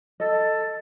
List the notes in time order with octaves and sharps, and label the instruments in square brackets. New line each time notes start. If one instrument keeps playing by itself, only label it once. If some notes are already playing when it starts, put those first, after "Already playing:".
[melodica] A4 [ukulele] D#5